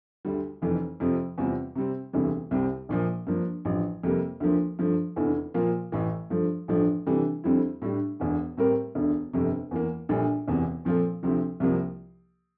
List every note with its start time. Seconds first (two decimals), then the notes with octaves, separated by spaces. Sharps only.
0.25 D2 D3 G3
0.62 F1 F2 E3
1.00 F2 C3 F3
1.38 E2 C3 G3 C4 F4
1.75 C3 G3 C4
2.13 E1 D2 C3 E3 G3
2.51 C2 C3 G3 C4 G4
2.89 A#1 A#2 F3 A#3
3.27 G2 F3 A#3 D4
3.65 A1 G2 F3
4.03 F2 C3 G3 A#3
4.40 D2 D3 F3 A#3
4.79 G2 F3 A3
5.16 F1 E2 D3 A3 E4
5.54 A#2 F3 A#3 F4
5.92 A1 A2 E3
6.30 G2 F3 A3
6.68 A1 G2 F3 A3 D4
7.06 C3 E3 G3 D4 A4
7.44 F2 D3 G3 C4 E4
7.82 A2 G3 D4
8.20 E1 E2 D3
8.57 A2 G3 C4 G4 A#4
8.95 E1 D2 D3
9.33 G1 F2 C3
9.71 E2 E3 A#3
10.09 A#1 A#2 G3 D4 A4
10.48 E1 E2 C3 E3
10.85 A#2 F3 C4 F4 A4
11.23 D2 C3 F3 C4
11.60 C2 C3 F3 A#3